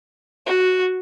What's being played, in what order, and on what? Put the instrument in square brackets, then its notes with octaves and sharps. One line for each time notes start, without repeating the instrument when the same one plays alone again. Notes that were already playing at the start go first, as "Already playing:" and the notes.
[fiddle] F#4